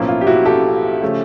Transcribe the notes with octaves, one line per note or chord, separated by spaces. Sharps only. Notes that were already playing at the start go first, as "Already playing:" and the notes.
Already playing: B1 A2 F3 A#3 C#4 E4
F4
G4
E4 F#4
G4 A4
C#3 F3 A3 C#4